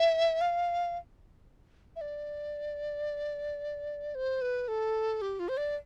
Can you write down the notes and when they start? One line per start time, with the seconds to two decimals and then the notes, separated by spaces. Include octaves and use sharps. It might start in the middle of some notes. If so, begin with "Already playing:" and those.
Already playing: E5
0.41 F5
1.96 E5
2.01 D5
4.15 C5
4.42 B4
4.68 A4
5.22 G4
5.39 F4
5.49 C5
5.57 D5